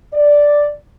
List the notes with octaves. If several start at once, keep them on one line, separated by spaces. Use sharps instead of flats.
D5